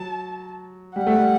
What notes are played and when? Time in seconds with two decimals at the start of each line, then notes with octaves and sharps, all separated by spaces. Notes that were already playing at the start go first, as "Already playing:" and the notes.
Already playing: F#3 A5
0.96 G3 F#5
1.07 A3
1.17 G3